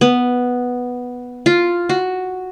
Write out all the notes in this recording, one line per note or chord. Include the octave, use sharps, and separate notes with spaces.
B3
F4
F#4